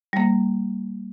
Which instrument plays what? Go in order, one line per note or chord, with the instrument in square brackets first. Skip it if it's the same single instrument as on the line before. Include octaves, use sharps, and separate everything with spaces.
[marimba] G3 A#3